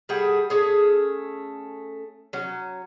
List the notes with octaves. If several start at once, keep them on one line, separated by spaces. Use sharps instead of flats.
G3 A3 G#4 F#5
A3 C#4 G#4
F#3 C#4